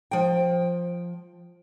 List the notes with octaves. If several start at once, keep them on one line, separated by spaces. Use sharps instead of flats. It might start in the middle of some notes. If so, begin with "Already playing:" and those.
F3 G5